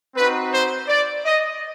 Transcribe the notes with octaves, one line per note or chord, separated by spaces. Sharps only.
C4 D#4 F#4 B4
C5
D5
D#5